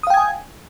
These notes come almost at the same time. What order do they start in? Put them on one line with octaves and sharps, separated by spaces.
D#6 F5 G5 G#6 G#5